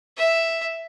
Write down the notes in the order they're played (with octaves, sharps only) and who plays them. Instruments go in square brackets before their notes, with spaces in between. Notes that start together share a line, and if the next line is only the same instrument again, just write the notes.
[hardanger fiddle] E5